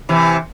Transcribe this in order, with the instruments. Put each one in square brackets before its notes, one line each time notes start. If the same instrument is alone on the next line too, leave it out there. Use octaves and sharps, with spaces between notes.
[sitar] C3 E3